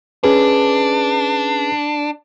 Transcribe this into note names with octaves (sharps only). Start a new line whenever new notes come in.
C#4 D4 G#4 B4